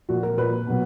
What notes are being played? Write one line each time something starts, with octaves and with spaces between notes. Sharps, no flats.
A#2 F3 F#4
A#4
A#2 F3 B4
B2 F#3